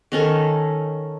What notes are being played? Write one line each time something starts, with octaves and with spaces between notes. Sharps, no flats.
D#3 C#4 A4